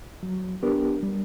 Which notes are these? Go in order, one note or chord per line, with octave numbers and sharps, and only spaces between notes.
F#3
B3 D4 G4 A#4
G3